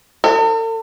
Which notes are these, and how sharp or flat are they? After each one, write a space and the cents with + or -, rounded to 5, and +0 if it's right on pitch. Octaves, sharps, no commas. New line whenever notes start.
A4 +45